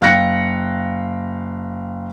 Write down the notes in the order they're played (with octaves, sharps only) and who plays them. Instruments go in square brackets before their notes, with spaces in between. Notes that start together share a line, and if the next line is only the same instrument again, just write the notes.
[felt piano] F#1 F5 G5 F#6 A#6 C#7